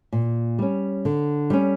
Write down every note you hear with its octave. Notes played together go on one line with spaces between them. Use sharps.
A#2
G3 C#4
D3
G3 C#4